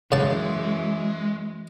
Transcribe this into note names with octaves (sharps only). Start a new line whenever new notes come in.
F#2 C#3 E3 G#3 A5